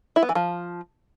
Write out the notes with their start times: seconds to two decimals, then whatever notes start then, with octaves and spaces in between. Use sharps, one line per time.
0.16 E4
0.23 B3
0.29 E3
0.35 F3